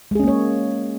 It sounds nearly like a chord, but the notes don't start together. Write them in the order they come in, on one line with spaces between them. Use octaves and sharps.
G#3 G#4 C#4 A#3 C#5